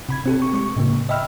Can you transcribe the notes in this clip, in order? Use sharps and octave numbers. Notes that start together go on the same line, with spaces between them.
C3 B5 G#6
C4 G4 A4
C#6
G#3 C#6
A2 C#3 A#3
D#5 E5 G5 B5 E6 F6